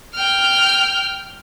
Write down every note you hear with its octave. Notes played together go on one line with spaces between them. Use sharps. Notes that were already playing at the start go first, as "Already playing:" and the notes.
G5 F6